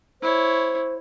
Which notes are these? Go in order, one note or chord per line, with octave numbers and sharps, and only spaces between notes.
E4 C5 C#5